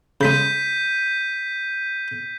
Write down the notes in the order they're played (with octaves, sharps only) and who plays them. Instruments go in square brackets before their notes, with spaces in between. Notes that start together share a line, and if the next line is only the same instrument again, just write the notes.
[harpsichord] C#3 G#3 [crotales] G6 B6 D#7